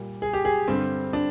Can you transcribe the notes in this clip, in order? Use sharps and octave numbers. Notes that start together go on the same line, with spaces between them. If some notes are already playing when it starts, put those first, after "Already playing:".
Already playing: A#2 G3
G#4
G4
G#4
G2 D3 G3 C4
D4